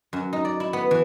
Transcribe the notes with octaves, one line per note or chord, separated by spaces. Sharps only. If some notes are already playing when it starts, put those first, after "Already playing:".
F#2
D#4
D5
E4
B3
E3